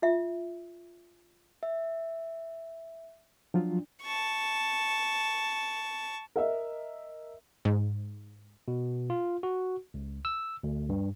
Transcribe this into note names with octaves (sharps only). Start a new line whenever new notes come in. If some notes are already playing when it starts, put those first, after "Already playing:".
F4 E5
E5
F3 F#3 D4 F4
A5 C#6
A#4 D#5 E5
G#2
B2
F4
F#4
C#2
E6
D2
G2